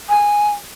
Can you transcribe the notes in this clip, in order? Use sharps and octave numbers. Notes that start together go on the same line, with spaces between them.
G#5